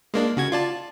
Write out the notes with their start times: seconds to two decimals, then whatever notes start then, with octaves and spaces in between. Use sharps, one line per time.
0.14 G#3 A#3 D4
0.37 C#3 F#4 G#6
0.52 F4 D5 A5